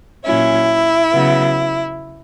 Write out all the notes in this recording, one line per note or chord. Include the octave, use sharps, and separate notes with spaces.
A#2 F#3 C#4 E4
C#3 F#3 B3